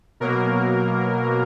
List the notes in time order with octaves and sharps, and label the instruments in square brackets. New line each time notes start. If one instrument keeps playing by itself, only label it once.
[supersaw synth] B2 F#3 A#3 A#4